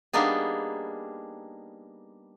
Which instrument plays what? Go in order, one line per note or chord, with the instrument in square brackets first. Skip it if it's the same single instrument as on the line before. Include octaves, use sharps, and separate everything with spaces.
[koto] G3 A#3 B3 D4 D#4 G#4